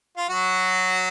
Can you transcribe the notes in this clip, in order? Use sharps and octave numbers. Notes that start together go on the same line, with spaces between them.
F4
F#3 F#4